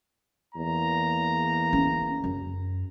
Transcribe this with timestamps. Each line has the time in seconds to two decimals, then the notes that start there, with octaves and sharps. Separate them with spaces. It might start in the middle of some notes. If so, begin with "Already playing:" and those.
0.55 E2 A#3 A#5
1.73 C#4
2.24 F#2